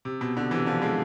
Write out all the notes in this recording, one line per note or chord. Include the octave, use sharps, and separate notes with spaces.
C3
B2
B2 D3
C3 E3
D3 F3
E3 G#3